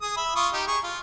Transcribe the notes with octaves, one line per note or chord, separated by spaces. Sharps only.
G#4 D#6
E5 B5
F4 C#6 D#6
D#4 G4
G#4 C#6
F4